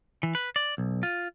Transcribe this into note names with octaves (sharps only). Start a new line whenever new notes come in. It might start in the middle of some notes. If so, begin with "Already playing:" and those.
E3
B4
D5
B1
F4